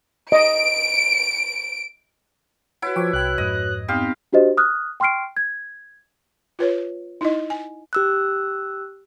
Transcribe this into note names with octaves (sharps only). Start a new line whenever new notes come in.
D#5 D7
E4 F#4 B4 C#5 F#5
F3 G5 C#6 D6
C2 G5 F#6
F2 G#2 D#5
B3 C4 D#4 G4 F5
D4 F#4 G4 C5 D#5
D#6 F6 F#6
G5 C6 C#6 F6 C7 D7
G#6
F4 B4 C#5
D#4 E4 D#5
G#5
G4 E6 F#6